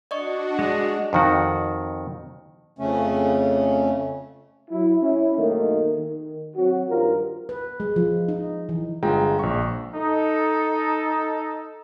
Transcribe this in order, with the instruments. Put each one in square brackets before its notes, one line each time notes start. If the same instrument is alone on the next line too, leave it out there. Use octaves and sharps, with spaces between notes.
[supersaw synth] D4 F#4 [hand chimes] D5 D#5 C#6
[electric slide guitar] G#3
[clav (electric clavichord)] F2 D#3 F#4
[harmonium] F2 C#3 A3 C#4
[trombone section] F#3 E4
C#4 E4
B1 D#3 A3 A#3 D#4
D#3
F#3 C4 F#4
G2 D#3 F3 F4 A#4
[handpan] B4
G#3
F3
D#4
E3
[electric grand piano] G1 G#3 F4 G5 A#5
A#1 C#6
[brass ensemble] D#4 A4